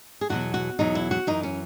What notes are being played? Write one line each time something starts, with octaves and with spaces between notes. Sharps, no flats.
G#4
E2 B2 F#3 F#4
F#4
E2 B2 F#3 D#4
E4
F#4
F#2 E3 D#4
C#4